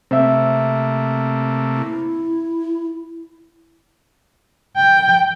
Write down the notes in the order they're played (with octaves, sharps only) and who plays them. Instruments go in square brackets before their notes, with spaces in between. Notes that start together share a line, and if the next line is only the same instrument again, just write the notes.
[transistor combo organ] C3 A3 A#3 [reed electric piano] C4 E5
[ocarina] E4
[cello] G5